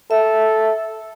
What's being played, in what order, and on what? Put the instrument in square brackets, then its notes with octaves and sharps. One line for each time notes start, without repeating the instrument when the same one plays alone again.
[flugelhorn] A4 [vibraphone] E5